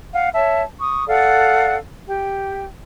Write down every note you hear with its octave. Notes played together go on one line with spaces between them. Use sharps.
F5 F#5
C#5 E5 A5
C#6 D#6
A4 D5 F5 F#5
G4 G5